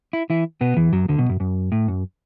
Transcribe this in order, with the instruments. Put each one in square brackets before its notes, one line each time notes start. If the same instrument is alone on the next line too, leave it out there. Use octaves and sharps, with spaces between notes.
[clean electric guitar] E4
E3 E4
B2 B3
E2 E3
F#2 F#3
D2 D3
B1 B2
F#2
F#2
A2
F#2